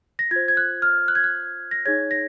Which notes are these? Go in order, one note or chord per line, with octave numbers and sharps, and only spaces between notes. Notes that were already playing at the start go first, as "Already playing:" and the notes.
A#6
F4 C5 G#6
G#6
F#6
F6
F#6
G#6
F#6
A#6
D#4 G#4 C#5 G#6
A#6